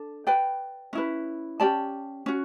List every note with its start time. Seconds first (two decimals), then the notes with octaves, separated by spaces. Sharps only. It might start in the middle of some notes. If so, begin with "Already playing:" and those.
Already playing: D4 A4
0.27 B4 D5 G5
0.93 C#4 E4 B4
1.60 C#4 G4 D5 A5
2.26 C#4 F#4